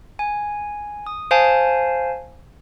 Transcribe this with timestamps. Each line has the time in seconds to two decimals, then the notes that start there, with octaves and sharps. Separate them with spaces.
0.19 G#5
1.06 D#6
1.31 C5 F5 G#5 A5